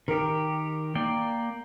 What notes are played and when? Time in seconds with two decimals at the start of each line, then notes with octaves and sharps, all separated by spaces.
0.08 D#3 G4 A#4
0.95 A#3 D5 G5